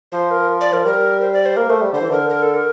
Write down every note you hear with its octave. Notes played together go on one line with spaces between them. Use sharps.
F3 C5
A#4
D5
F3 A#4
G3 A#4
C5
D5
C5
A#3 A#4
A3 C5
G3
D3 C5
E3
D3 A#4
A#4
A4
A#4